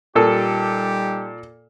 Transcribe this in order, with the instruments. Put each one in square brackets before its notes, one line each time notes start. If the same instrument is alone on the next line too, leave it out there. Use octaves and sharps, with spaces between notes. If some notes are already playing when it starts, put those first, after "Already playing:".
[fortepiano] A#2 A4 [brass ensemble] G3 D#4 G4